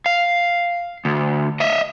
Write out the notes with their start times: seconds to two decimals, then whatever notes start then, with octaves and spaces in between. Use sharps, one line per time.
0.06 F5
1.05 D2
1.60 D#5 E5